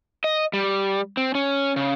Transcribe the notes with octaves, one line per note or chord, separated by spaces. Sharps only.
D#5
G3
C4
C#4
C#3